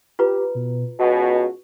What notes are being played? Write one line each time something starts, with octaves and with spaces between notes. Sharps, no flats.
F4 G4 B4 A#5
B2
C#2 B2 F#4